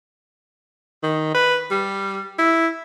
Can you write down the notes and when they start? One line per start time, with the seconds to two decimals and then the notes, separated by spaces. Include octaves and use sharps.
1.03 D#3
1.34 B4
1.71 G3
2.39 E4